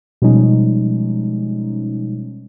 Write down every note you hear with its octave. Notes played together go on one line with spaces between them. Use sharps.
B2 F3 G3 G#3 C#4 D#4